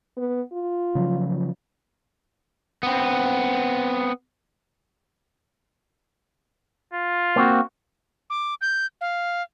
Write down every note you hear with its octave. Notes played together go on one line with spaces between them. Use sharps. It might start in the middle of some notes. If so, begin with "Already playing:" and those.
B3
F4
C#3 F3 F#3
B3 C4
F4
A#3 C4 F#4
D6
G6
F5